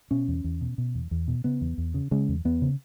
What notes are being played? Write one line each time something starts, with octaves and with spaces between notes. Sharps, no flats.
B2 C#4
E2
E2
B2
B2
E2
E2
B2
C#3 B3
E2
E2
C#3
C#3 G#3
E2
E2 B3
C#3